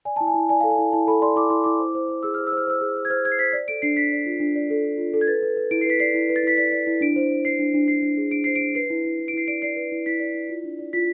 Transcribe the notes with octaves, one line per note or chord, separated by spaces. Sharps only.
D5 G#5
E4 A5
G#5
E4
D5 G#5
A4 F5
G#5
E4
E4 A5
A4 B5
D5 C6
E4 D6
E4 C6
E4 D6
C5
C5
C5
G#4 E6
C5 F6
E6
C5 F6
C5 E6
G#4
C5
G#6
C5 F6
G#4 G#6
C7
C5 B6
D5
A4 D7
D4 C7
D4 B6
D5
F4
D4
D5
A4
A4
F4
A4
G#6
B4 A6
B4
B4
E4 D7
C7
B4 B6
D5 C7
E4
B4
A6
E4 B6
D5 B6
D5
E4
D4 D7
C5
C5
C5 C7
D4
D4
D4 C7
D4
G#4
D4 D7
C5 C7
D7
D4
B4 C7
E4
E4
E4
D7
E4 C7
D5 D7
D5 C7
B4
E4
E4 B6
D5
E4
F4
D4
D5
F4 B6